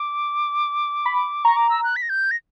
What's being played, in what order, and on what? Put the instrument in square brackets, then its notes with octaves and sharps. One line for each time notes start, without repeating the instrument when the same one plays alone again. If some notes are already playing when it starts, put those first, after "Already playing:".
Already playing: [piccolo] D6
[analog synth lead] B5
[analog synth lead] A#5 [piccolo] C#6
[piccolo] D6
E6
F#6
B6
A#6
G6
A#6